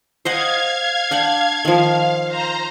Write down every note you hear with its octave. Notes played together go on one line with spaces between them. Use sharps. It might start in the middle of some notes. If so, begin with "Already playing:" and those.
C5 D#5 F5 F#5 G#6
D4 F#5 G5
D#3 F3 F5
C5 A#5